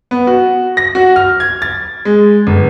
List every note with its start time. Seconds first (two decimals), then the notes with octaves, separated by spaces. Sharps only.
0.11 B3
0.27 F#4
0.77 A#6
0.95 F#4
1.16 F6
1.40 G#6
1.62 A6
2.05 G#3
2.47 G1